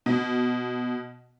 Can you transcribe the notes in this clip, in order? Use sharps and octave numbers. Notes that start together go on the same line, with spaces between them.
B2